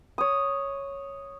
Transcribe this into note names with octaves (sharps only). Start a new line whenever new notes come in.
C#5 D#6